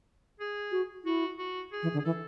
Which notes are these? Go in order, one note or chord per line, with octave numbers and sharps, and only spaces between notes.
G#4
F#4
E4 F#4
F#4
G#4
E3
D3
G#4
E3 A4